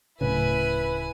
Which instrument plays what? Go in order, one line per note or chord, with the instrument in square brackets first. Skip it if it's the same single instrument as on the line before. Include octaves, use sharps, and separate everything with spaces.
[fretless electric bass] D1 A2 C#3 [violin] E4 G#5 [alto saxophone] B4